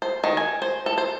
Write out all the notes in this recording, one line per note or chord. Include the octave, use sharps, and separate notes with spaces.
C5
D#3
G#5
C5
A4
C5